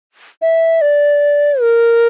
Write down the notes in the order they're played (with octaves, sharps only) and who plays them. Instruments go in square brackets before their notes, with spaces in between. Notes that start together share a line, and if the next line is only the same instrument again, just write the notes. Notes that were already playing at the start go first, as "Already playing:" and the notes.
[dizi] E5
D5
A#4